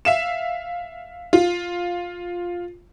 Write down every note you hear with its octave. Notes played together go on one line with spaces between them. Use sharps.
E5 F5 E7
F4